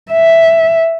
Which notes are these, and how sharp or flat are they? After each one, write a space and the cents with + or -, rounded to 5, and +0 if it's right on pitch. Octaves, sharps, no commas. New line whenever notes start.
E5 +0